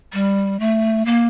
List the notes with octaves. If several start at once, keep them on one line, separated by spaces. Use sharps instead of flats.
G3
A3
A#3